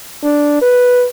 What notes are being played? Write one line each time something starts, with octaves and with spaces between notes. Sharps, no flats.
D4
B4